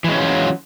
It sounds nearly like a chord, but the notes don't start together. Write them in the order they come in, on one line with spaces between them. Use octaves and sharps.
E3 G#3 C#4 F#3 F4